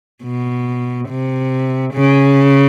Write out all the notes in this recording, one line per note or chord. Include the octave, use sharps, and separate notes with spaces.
B2
C3
C#3